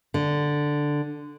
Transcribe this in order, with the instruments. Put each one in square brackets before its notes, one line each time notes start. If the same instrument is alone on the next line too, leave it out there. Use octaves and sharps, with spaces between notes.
[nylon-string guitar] D3